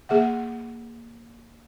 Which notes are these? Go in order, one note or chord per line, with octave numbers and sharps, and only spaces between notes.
A#3 G#4 E5 F#5